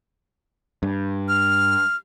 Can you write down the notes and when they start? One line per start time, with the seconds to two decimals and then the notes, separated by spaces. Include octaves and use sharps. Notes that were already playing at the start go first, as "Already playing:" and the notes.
0.83 G2
1.29 F6